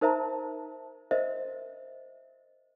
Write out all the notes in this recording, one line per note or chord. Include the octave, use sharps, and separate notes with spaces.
D#4 A#4 C5 E5 A5 A#5
A#4 C5 D#5 E5